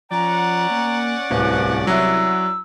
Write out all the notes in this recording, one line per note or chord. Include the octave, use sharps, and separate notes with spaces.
F3 C#4 D5 F#5 A#5
A#3
D1 C2 B4
F#3 E4 E6